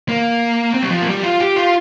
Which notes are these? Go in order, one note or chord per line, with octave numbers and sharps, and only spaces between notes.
A#3
C4
G3
F3
A#3
G3
F4
G4
F4